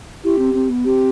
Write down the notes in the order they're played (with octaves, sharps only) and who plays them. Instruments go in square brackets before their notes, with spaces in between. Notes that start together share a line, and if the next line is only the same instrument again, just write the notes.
[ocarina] E4 [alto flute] G4
[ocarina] C4
C4
B3
[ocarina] C4 [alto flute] G4